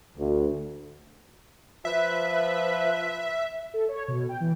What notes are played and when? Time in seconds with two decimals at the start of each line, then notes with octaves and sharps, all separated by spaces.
0.17 D2
1.85 F3 B4 E5
3.74 A4
3.89 C#5
4.08 B2
4.29 G5
4.41 E3